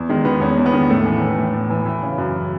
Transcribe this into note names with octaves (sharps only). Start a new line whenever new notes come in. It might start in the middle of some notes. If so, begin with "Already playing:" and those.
Already playing: E2
D#3 G#3
D#3 B3
E2 C#4
E2
B3
D#3
A2 A3
E3
E3
A2
A2
E3
E3
C#3
F#2